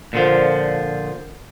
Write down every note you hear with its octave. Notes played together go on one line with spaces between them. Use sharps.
A#2 D3 F3